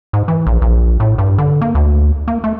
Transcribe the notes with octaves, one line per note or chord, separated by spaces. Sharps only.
G#2
E3
A#1
A#1
A2
G2
D3
A#3
D2
A#3
A3